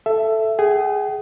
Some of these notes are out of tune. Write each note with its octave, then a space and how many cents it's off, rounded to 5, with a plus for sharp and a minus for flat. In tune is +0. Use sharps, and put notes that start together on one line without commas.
A4 +0 E5 +15
G#4 +0 G5 -45